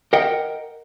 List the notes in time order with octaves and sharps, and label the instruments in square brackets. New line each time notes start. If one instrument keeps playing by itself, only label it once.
[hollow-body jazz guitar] A#4 D#5 F#5 G5